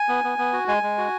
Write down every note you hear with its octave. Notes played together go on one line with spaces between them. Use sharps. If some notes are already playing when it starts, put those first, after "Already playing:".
Already playing: G#5
B3
B3
B3
F#4
G#3 G#5
G#3
F#4